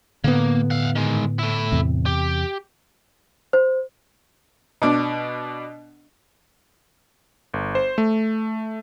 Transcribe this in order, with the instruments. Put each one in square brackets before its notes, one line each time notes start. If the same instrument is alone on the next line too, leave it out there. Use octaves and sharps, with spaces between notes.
[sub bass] A2 [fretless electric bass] D3 B3 [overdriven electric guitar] A#3
[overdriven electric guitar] F5 F#5
D#3 G#3
A3 E4
[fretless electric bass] E2 C3
[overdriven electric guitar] G4
[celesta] C5
[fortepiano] B2 D4
[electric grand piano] G1
C5
A3